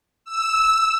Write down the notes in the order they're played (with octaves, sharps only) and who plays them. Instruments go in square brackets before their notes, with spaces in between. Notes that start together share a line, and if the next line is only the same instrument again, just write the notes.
[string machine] E6